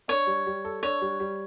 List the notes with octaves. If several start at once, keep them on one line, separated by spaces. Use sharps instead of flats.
D4 C#5
G3
G3
A4
D4 C#5
G3
G3